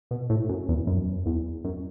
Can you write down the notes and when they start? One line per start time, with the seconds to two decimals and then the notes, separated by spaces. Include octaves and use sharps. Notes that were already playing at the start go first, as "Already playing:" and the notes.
0.11 B2
0.30 A2
0.49 F#2
0.68 E2
0.87 F#2
1.26 E2
1.65 F#2